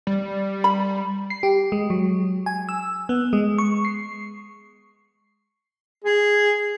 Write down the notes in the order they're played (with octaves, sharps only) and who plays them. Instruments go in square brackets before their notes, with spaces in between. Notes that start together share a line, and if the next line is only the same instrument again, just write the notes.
[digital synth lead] G3
[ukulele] B5
[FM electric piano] C7
G4
G#3
F#3
G#5
E6
B3
G#3
C#6
C7
[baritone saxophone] G#4